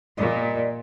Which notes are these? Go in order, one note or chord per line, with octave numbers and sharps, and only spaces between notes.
A#2 G3 D5 D#5